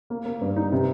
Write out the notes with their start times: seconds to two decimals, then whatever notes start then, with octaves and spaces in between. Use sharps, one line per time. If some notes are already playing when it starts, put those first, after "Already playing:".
0.10 A#3
0.25 A#3
0.41 G2
0.56 D#4
0.72 C3